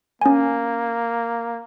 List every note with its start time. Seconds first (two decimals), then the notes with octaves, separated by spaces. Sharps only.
0.21 A#3 C#4 G#5